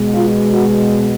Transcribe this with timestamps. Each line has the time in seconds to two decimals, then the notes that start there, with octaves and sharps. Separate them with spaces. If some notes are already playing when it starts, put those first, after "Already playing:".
Already playing: B2 G#3
0.13 F4
0.54 F#4